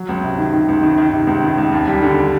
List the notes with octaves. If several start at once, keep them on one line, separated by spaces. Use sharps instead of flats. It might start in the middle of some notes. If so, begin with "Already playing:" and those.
Already playing: F#3
C#2
C3
D#3
D#3
C#2
D#3
D#3
C3
C#2
D#3
C#2
D#2
G3
D3
G3